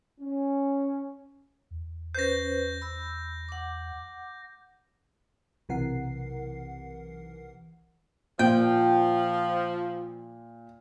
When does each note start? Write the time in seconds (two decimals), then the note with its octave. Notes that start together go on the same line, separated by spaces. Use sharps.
0.21 C#4
1.71 E2
2.15 C#4 B4 C5 G6 A#6
2.82 B5 E6
3.49 F#5 D6
5.69 B1 C3 E3 A#4 F#5 C7
8.39 A#2 F3 G5